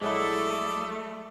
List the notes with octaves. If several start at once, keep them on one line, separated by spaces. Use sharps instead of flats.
A#1 F#3 G#3 A3 E4 A4 D5 D#5